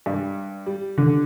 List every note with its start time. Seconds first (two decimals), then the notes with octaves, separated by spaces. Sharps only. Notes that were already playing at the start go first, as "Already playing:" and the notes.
0.06 G2
0.66 G3
0.97 D3